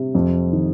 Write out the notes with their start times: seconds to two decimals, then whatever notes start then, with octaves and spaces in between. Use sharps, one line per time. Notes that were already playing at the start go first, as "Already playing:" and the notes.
Already playing: C3
0.15 F2
0.53 D#3